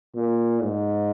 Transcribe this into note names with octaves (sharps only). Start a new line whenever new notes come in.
A#2
G#2